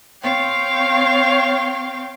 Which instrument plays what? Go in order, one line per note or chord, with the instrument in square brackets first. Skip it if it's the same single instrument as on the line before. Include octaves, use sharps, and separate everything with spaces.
[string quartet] C4 C#5 F5 G5